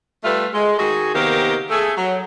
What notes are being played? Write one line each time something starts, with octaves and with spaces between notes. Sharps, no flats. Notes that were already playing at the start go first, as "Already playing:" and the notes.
G3 A3 F4 B4 E5
G#3
D#3 F#4 G#4
C3 D#3 A#3 B3 G4
A3 G#4
F#3